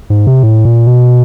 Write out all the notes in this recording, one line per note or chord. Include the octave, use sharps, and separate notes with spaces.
G#2
C3
A2
A#2
B2